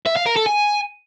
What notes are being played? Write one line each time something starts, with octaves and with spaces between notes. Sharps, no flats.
E5
F5
A#4
A4
G#5